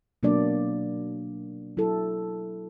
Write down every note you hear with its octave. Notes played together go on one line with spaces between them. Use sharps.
B2 F#3 A#3 D4 D5
F#3 E4 A4